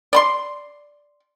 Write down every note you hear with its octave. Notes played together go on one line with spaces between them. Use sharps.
D5 B5 C6